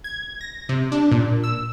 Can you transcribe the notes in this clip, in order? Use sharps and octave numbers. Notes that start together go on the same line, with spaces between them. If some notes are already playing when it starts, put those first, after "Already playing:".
G#6
A#6
C3
D4
A#2
E6